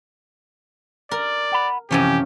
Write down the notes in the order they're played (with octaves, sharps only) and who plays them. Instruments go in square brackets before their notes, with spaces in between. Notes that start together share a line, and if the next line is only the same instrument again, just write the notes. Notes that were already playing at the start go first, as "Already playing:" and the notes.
[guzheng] A#4 [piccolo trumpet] D5
[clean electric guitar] F#5 B5
[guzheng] F#2 F3 C#4 [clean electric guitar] C3 E3 G#5 [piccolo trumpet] G4